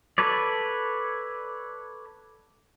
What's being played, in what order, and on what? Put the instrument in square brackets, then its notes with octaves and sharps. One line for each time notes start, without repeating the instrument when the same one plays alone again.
[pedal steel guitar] A4 B4 C#5 D5